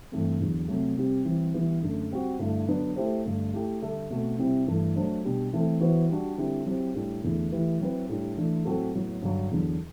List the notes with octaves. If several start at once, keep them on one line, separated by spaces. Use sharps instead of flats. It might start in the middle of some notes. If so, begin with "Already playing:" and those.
G2 E3 A3 C4
E2 D3 F#3
C3 F#3 A3
C3 G3 C4 G4
E3 G3 C4
E3 G3 B3
F#2 D3 A3
G3 C4 F#4
G2 D3 A3 E4
D3 F#3 B3 D4
A3 E4 G4 C5
G2 D3 A3
A3 E4 G4
D3 G3 D4 A4 E5
B2 A3 C4 F#4
C3 G3 C4 E4
G2 E3 A3 E4 A4
F#3 A3 D4 A4 C5
B2 G3 D4 G4
E3 A3 C4 E4 A4
E3 B3 F#4 C5
G3 D4 F#4
D3 G3 C4 E4 G4
F#3 C4 E4 G4
A2 G3 D4
E2 D3 A3 E4
E3 A3 E4 G4 B4
F#3 C4 E4 B4
A2 G3 D4
E3 A3 D4
A2 F#3 C4 F#4 A4
A2 F#3 B3
G2 D3 F#3
E2 D3 F#3